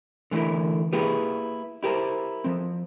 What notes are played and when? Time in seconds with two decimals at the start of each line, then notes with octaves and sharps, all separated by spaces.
0.31 D3 E3 A3 E4 A#4
0.93 A#3 E4 G4 G#4 B4
1.83 E4 G4 A#4 C5
2.44 F3 C4